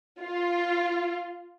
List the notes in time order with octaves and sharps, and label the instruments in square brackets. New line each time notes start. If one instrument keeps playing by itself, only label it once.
[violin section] F4